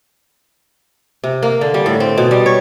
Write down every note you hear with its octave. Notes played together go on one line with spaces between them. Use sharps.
C3
A#3
D3
G3
A2
C4
B2
G3
C#5